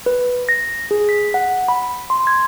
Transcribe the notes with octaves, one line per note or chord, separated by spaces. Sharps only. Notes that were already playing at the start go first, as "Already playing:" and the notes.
B4
A#6
G#4
B6
F#5
B5
C6
G#6